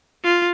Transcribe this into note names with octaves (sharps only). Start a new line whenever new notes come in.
F4